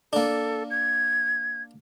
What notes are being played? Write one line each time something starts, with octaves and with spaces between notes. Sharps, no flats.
A#3 D4 A4
G#6